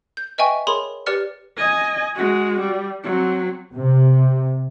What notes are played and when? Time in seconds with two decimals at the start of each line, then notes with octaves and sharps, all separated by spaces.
0.17 G6
0.38 B4 D#5 E5 G5 G#5 C#6
0.67 G#4 A#4 C#5 B5 C6 F#7
1.06 G4 B4 D5 F6 C#7
1.58 D#5 G#5
2.16 G#3 F#4
2.60 G3
3.03 F#3 C4
3.74 C3